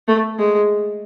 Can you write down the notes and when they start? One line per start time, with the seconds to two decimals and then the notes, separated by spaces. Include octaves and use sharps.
0.08 A3
0.39 G#3